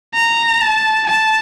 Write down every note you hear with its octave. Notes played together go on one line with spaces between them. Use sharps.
A#5
A5
A5